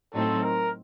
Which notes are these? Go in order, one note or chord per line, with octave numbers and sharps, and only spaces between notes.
A2 F#3 C4 D#4 A4
A#4